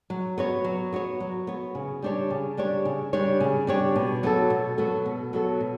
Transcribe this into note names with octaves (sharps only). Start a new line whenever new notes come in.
F#3
B3 F#4 C#5
F#3
B3 F#4 C#5
F#3
B3 F#4 C#5
C#3
G3 D4 G4 C#5
C#3
G3 D4 G4 C#5
C#3
G3 D4 G4 C#5
C#3
G3 D4 G4 C#5
B2
F#3 B3 F#4 A4
B2
F#3 B3 F#4 A4
B2
F#3 B3 F#4 A4
B2